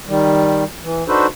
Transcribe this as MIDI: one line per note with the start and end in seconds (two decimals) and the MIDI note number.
0.07 0.64 51
0.07 0.64 55
0.84 1.04 52
1.08 1.27 62
1.08 1.27 63
1.08 1.27 66
1.08 1.27 69
1.08 1.27 71
1.08 1.27 72